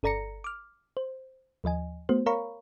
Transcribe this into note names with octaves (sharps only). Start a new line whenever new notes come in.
G1 A4 D5 A#5 A#6 C#7
D6 F6
C5
D#2 F3 D#5 G#5
A3 B3 F#4 C5
A#4 C#5 F5 A#5 B5 C#6